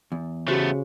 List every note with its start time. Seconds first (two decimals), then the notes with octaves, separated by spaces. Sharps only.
0.12 E2
0.48 C#3 A3 B3 F#4 G4 C5